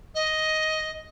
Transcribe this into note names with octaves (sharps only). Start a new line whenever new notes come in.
D#5